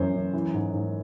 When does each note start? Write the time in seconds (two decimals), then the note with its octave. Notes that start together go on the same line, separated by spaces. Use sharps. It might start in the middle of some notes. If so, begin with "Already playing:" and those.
Already playing: F#2 E3 C5
0.14 F#2
0.34 E3
0.54 G#2
0.73 G#2